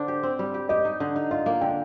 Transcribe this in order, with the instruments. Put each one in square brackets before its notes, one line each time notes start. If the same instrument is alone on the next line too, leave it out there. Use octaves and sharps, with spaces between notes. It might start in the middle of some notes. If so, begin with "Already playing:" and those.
Already playing: [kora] D3 D4 [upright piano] C5
[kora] G4
C4
G3
G4
[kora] G4 [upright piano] D#5
[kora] D#4
D3
D#4
[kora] F4 [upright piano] D#5
[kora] A#3
[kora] D3 [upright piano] G5